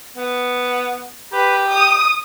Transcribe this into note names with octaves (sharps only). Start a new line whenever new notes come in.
B3
G4 B4
D#6